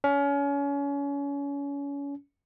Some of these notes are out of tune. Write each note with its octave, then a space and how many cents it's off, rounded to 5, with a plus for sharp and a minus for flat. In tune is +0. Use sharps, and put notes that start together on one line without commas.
C#4 +30